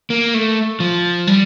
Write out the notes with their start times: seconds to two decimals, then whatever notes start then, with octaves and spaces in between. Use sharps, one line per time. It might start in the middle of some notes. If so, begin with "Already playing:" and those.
0.10 A#3
0.34 A3
0.80 F3
1.27 G3